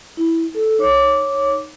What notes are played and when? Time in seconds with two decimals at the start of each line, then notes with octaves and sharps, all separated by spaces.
0.17 E4
0.55 A4
0.79 D#4 C#5 D6